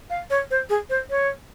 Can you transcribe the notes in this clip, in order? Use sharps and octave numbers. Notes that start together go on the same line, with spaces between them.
F5
C#5
C5
G#4
C5
C#5